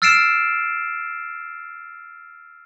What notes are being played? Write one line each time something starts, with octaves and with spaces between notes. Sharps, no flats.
E6 F6 A6 C7 D7 E7